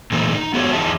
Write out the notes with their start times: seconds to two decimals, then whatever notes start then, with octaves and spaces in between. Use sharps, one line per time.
0.12 A#2 E3 A3 A#3 D#4
0.34 D#4
0.54 B3 F#4 G4 B4 C#5
0.73 E2 D#4 E4 G4 E5 A5